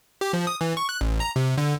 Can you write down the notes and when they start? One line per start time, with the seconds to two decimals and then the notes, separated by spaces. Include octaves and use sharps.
0.21 G4
0.33 F3
0.47 D#6
0.61 E3
0.77 C#6
0.89 F#6
1.01 A1
1.20 A#5
1.36 C3
1.58 D3